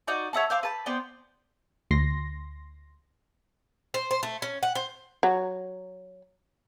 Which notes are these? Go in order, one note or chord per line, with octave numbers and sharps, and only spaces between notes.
D#4 F#4 D5 G6
C#5 E5 F#5 A5
C5 F5 D6 E6
B4 A5
B3 C5 D5 G5
D2 C6 A#6
C5
C5
A3
C#4
F#5
C5
F#3